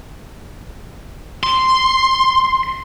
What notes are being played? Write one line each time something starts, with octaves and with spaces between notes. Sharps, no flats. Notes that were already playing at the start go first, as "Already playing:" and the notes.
C6